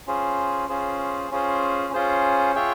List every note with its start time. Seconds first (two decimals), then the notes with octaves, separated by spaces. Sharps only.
0.07 C#4 F4 G#4 C5
0.69 C#4 F4 G#4 C5
1.31 C#4 F4 G#4 C5
1.93 C#4 F4 G#4 C5
2.55 F4 G#4 C#5 E5 G5